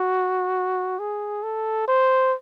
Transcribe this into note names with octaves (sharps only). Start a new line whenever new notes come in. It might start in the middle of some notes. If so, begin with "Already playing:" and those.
Already playing: F#4
G#4
A4
C5